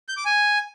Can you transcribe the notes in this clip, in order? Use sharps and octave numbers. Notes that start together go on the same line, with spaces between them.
G6
D6
G#5